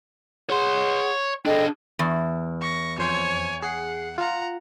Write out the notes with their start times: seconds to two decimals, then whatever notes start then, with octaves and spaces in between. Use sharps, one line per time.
0.50 G#4 C#5 F#5 C6
1.46 D4 G#4 A4 D#5 G5
1.99 E2
2.61 C#6 A#6
2.98 F2 C5 C#5 G#5
3.62 G#4 F#5 C7
4.18 F4 F#5 A#5